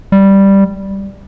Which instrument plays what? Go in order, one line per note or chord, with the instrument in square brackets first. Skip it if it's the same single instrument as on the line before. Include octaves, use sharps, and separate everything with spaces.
[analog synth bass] G3